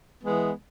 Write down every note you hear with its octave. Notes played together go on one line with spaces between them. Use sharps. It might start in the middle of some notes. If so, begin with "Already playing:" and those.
E3 G#3 B3